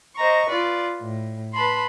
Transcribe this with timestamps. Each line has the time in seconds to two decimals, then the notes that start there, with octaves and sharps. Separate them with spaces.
0.17 C5 D#5 A#5 C#6
0.47 F4 B4 D5
1.01 A2
1.54 B4 A5 B5 C6